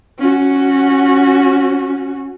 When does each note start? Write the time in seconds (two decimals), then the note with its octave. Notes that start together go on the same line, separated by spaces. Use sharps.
0.19 C#4 F#4